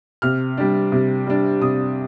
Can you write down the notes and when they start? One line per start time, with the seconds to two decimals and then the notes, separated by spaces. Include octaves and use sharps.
0.22 C3 F6
0.57 G3 D4
0.92 C3
1.27 G3 D4
1.61 C3 D#6